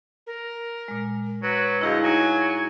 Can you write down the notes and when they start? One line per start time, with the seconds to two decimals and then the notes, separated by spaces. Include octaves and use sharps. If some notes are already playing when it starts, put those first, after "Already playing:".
0.27 A#4
0.88 A#2 G#3
1.43 F#3 B4
1.81 D2 E4 G#4 D#5 F5
2.02 F#3 D#4 G#5